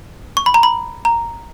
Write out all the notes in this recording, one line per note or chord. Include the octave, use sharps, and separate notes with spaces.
C#6
B5
A#5
B5
A#5